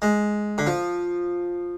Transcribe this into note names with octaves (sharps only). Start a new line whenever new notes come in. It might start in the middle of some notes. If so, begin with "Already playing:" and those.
G#3
D3
F3